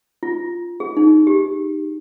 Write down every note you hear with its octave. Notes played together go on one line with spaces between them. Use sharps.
F4
G#4
D#4
G4